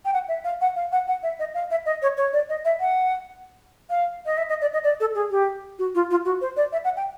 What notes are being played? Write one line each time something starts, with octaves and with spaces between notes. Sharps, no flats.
G5
F#5
E5
F5
F#5
F5
F#5
F#5
E5
D#5
F5
E5
D#5
C#5
C#5
D5
D#5
E5
F#5
F5
D#5
E5
D#5
D5
D#5
D5
A4
G#4
G4
F#4
F4
F4
F#4
C5
D5
E5
F#5
G5